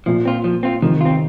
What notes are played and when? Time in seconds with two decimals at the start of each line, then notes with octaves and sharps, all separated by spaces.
0.06 A#2 F3
0.25 C4 F4
0.44 F3
0.63 C4 F4
0.82 C3 D#3 F3
1.01 C4 F4